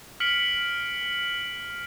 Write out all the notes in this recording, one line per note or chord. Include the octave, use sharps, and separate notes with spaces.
F6 B6 C#7 D7 F#7